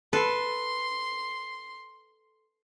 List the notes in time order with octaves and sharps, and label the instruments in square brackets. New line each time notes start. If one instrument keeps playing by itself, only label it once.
[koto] A4 B4 [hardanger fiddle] C6